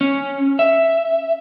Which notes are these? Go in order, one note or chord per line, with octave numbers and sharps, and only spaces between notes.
C#4
E5